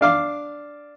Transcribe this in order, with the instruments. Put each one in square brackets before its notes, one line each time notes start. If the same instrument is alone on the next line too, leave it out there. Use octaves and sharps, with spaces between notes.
[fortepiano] D4 F5 D6